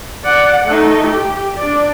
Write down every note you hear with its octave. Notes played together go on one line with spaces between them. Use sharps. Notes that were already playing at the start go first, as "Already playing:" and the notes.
D5 F#5
A3 D#4
G4
D4 D5